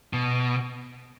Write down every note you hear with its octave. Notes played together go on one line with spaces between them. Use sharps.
B2